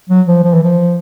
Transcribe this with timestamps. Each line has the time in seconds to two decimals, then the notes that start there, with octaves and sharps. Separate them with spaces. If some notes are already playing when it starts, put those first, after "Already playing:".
0.10 F#3
0.27 F3
0.44 F3
0.54 E3
0.63 F3